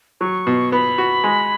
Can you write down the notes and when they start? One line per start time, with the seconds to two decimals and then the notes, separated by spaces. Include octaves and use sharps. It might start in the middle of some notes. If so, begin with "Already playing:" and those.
0.21 F#3 C#6
0.47 B2
0.72 B3 B5
0.98 F#4
1.24 G#3